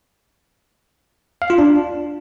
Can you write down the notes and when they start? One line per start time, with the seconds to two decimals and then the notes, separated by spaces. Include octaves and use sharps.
1.42 F5
1.50 F4
1.58 D4